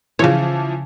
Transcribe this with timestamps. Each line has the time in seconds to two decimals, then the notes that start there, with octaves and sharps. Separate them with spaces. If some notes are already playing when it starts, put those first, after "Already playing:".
0.19 C#3 E3 F3 C#5